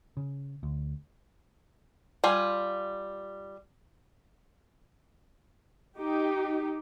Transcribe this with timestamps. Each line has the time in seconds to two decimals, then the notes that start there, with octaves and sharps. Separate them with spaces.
0.17 C#3
0.63 D2
2.24 G3 F4 G#5
5.99 D#4 G4